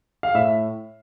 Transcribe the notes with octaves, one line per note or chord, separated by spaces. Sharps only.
F5
A2 E5